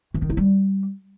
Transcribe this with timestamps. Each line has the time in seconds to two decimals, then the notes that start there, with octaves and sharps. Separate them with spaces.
0.14 E3
0.22 D#3
0.30 E4
0.37 G3